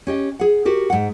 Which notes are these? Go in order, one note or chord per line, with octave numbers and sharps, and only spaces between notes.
C#4 G4 D#5
G#4 F#5
F#4 G4 A#4
G#2 F#5